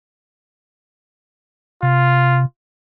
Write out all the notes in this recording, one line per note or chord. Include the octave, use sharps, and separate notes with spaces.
C3 F4